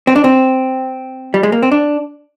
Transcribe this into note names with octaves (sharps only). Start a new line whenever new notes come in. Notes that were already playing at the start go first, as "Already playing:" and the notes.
C4
D4
C4
G3
G#3
A#3
C4
D4